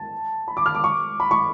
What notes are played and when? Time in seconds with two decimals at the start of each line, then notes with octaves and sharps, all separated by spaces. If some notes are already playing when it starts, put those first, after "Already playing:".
Already playing: A5
0.48 B5
0.57 D6
0.66 F6
0.75 D6
0.84 C#6
1.20 B5
1.31 C#6